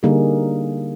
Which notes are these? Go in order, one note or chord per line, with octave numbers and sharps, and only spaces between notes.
D3 G3 A#3 D#4 G#4